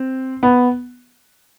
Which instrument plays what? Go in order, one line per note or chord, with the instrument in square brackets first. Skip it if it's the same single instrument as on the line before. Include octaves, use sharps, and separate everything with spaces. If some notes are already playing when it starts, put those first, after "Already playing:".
Already playing: [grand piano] C4
B3